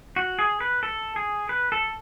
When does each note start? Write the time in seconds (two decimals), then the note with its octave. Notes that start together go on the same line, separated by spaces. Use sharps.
0.16 F#4
0.39 G#4
0.60 B4
0.83 A4
1.16 G#4
1.49 B4
1.72 A4